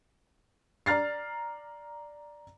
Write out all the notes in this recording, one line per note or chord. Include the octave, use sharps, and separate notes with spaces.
D5 A#5 F6 A6 C7